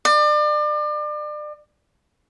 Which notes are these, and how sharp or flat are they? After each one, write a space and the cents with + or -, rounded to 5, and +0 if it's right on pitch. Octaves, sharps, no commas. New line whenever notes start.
D5 +35